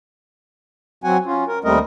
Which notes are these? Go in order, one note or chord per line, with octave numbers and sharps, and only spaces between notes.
F#3 C4 F#4 F#5 G#5
C#4 F4
A#4
D#2 G3 A3 C4 A#4 D#5